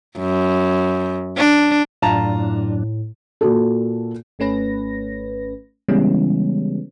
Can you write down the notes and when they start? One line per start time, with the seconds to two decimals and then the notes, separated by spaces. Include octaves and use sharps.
0.18 F#2
1.37 D4
2.02 F#2 A2 D4 F4 A5 A#5
3.41 A#2 F#4 A4
4.39 G#1 A3 C#4 B4 A#6
5.88 C#3 E3 G3 G#3 B3 C#4